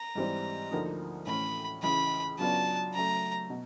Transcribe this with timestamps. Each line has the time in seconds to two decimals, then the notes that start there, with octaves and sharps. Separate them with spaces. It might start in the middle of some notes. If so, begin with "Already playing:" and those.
Already playing: A#5
0.15 G#2 E3 G3 C4
0.71 D2 D3 F3 A#3 D#4
1.27 A2 E3 A3 C#4 B5
1.83 C#2 C#3 E3 G#3 B5
2.38 C#3 F#3 B3 D4 F4 A5
2.94 C#3 F#3 A3 A#5
3.50 B2